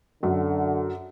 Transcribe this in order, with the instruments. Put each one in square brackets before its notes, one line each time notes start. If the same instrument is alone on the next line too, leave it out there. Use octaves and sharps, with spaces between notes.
[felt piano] F#2 [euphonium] D3